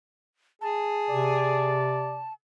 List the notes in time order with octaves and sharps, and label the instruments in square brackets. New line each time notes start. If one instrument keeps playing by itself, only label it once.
[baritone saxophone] G#4 [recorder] A5
[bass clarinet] C3 [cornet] D5